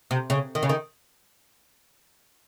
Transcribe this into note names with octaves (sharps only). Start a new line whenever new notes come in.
C3
C#3
D#3
C#3
D#3